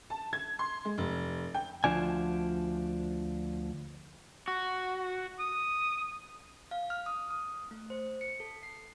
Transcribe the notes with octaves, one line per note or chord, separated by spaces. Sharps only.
A5
G#6
C6
G#3
F1
G5
D2 F3 D4 G#5
F#4
D#6
F5
F6
D#6
D#6
A3
C5
C#7
A4
C7